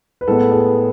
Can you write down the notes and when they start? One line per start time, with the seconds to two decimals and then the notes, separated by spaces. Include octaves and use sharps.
0.21 B4
0.28 A2 G#3 B3 A4
0.51 G#4